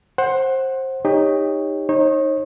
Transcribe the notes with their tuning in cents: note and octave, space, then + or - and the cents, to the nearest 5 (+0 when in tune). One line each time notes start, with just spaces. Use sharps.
C5 +20 F#5 +0
D#4 +0 G4 +30 C#5 +0
D#4 +0 C#5 -35